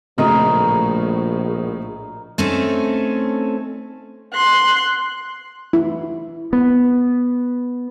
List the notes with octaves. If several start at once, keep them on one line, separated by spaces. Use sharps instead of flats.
A#1 A2 C#3 F#3 A#4 D#5
A3 C4 C#4 D#4 A4
C6 F#6
E4
B3